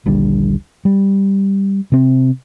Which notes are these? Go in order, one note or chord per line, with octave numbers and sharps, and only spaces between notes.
D#1 A#1 D3 G3
G3
C3 C4